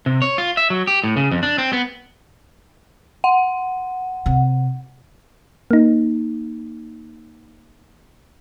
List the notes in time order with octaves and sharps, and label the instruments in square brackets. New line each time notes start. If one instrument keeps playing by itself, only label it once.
[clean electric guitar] C3
C#5
F4
E5
F#3
G4
A2
C#3
F2
D4
C4
B3
[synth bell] F#5
[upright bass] C3
[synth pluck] A#3 D#4